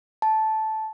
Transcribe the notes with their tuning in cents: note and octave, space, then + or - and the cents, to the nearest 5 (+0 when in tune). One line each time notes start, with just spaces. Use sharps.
A5 -10